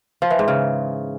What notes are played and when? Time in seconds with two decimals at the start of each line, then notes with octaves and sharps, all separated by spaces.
0.22 F3
0.30 E3
0.39 G#2
0.48 C#3